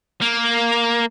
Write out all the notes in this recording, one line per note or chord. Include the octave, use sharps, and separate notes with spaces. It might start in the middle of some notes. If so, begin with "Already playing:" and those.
A#3